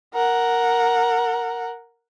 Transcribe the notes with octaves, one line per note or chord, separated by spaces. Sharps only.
A#4 F#5